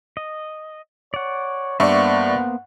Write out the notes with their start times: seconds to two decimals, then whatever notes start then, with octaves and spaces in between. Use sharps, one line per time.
0.17 D#5
1.14 C#5 D5 F#5
1.80 G2 A#3 B3 C5 D5 E5 F#5 C#6